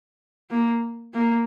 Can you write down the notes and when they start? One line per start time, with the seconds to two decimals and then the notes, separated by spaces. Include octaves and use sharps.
0.50 A#3
1.14 A#3